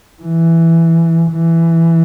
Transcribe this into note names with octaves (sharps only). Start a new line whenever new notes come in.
E3
E3